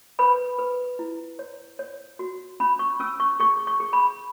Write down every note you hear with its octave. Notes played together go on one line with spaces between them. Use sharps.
B4 B5
B4
E4
C#5
C#5
F#4
C#4 B5
C#6
C#4 E6
C#6
G#4 C#6
C#6
G#4
B5